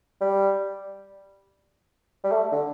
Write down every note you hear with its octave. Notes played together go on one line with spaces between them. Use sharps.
G3
G3
A3
D3